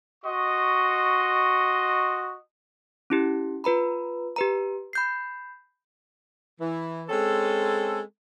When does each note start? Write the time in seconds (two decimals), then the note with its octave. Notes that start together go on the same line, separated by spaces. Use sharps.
0.24 F#4 D#5 C6 C#6
3.10 C#4 E4 G4
3.64 F4 B4 A#5 B5
4.36 G4 B4 A#5
4.93 B5 G6 C7
6.60 E3
7.10 G#3 C4 C#4 A4